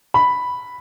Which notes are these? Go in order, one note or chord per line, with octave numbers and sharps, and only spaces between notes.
B5